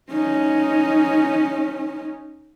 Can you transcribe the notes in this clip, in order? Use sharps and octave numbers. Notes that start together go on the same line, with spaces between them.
C#4 D#4